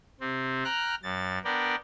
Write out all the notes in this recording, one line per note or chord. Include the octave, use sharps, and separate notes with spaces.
C3 C4
G5 A#5 F6 F#6
F#2 A6
B3 D4 A#4 D5 G5